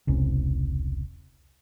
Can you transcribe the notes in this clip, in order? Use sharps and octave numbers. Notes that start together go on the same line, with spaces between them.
E1 C2 C#3 C#4